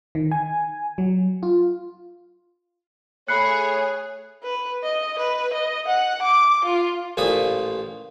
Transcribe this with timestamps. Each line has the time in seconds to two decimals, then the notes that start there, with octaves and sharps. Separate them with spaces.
0.15 D#3
0.31 G#5
0.98 F#3
1.43 F4
3.28 A3 G#4 C#5 B5 F#6 C7 C#7
4.43 B4
4.83 D#5
5.18 B4
5.53 D#5
5.88 F#5
6.22 D6
6.65 F4
7.17 A1 A#2 F3 B4 D#6